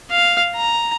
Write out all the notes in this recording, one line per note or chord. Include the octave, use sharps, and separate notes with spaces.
F5
A#5